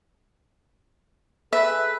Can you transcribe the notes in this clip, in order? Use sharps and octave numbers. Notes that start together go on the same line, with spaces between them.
G#4 A4 B4 E5